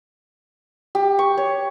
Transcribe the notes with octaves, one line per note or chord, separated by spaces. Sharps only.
G4
C#6
C#5